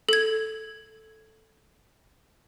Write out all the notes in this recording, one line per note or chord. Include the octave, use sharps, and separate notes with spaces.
A4 G#6